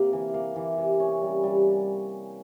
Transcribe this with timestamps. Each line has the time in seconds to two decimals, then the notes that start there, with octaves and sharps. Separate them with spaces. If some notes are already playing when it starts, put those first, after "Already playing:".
Already playing: C3 A#3
0.13 E3
0.34 A#3
0.56 E3
0.78 C3
1.00 C#4
1.22 G3
1.43 G3